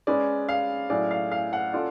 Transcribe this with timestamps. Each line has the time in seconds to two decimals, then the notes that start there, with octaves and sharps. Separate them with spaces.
0.07 G#3 C#4 G#4 B4 D5
0.49 F5
0.90 A2 F#3 C#4 G#4 D5
1.11 F5
1.32 F5
1.53 F#5
1.73 C#4 F4 A4 D5